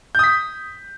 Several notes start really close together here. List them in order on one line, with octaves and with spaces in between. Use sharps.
G6 D#6 B6